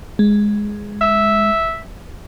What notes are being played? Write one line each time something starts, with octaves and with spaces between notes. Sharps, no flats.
G#3
E5